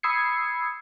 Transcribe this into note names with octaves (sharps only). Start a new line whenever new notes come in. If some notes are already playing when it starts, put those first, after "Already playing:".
B5 D#6 E6 G#6 C7 C#7